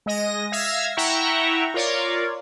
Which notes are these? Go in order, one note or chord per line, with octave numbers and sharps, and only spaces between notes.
G#3 D#5 A#6
E5 F5 E6 G#6 A#6
E4 E5 F#5 G5 A#5 C#6
F4 A#4 C#5 D5